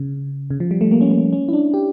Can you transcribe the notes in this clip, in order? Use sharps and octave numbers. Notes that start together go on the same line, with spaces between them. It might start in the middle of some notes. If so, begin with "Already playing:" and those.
Already playing: C#3
C#3
F3
G3
A3
A#3
C#4
A#3
C#4
E4
D4
G4